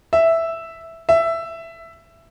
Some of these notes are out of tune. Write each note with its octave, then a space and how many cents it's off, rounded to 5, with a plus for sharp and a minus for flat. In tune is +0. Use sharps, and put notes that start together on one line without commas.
E5 +0
E5 +10